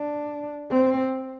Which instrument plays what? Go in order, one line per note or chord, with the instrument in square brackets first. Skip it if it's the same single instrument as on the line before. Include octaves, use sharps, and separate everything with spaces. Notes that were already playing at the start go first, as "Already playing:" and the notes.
Already playing: [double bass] D4
C4